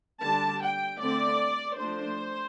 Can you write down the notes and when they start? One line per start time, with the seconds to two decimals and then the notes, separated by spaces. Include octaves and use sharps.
0.23 D3 G3 D4 A5
0.63 G5
1.01 D3 A3 C4 D5
1.79 F3 A3 D4 C5